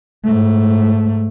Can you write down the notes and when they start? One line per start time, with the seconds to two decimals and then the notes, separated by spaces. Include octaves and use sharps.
0.24 G#2 A3